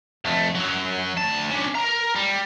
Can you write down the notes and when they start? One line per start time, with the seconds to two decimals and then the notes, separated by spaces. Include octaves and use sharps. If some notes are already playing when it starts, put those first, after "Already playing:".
0.25 F2 A3
0.55 F#2 F#3
1.18 D2 A5
1.51 C#4 D4
1.75 A#4 A#5
2.16 G3